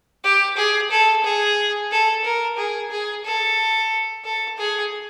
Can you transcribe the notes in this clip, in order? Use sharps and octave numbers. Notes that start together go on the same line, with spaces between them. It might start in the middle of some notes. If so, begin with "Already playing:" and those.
G4
G#4
A4
G#4
A4
A#4
G#4
G#4
A4
A4
G#4